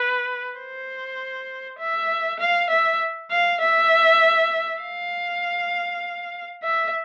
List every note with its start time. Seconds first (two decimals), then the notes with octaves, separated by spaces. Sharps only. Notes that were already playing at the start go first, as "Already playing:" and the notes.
Already playing: B4
0.58 C5
1.79 E5
2.40 F5
2.70 E5
3.31 F5
3.60 E5
4.82 F5
6.63 E5